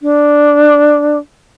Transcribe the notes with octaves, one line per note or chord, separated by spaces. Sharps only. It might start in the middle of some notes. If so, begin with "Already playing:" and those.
D4